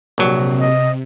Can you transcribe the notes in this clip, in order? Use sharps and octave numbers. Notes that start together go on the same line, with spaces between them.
A#1 C3 F#3
D#5